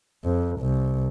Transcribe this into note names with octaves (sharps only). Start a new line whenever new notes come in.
F2
C2